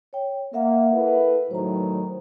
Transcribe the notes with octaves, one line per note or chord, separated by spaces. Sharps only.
C#5 G5
A#3 A#4 E5 F#5
E4 A4 B4
A2 D#3 F#3 C5 A#5